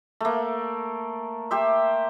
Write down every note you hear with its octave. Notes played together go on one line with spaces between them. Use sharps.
A3 A#3
G4 C5 E5